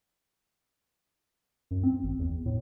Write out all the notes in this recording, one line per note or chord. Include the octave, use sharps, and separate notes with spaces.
F#2
C4
G#1
E2
A2